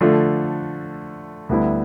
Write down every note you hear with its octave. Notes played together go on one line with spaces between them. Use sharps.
D3 F3 A3 D4 F4
D2 D3 G3 B3 E4